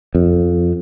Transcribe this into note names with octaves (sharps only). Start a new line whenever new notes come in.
F2